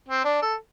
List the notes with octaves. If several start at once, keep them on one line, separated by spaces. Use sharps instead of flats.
C4
D4
A4